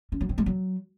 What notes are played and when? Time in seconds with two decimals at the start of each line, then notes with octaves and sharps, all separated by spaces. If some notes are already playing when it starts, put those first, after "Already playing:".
0.12 C#4
0.21 F#3
0.29 C4
0.38 G#3
0.46 F#3